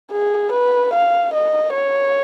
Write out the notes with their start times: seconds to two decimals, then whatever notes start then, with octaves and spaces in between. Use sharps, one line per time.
0.12 G#4
0.52 B4
0.94 F5
1.34 D#5
1.74 C#5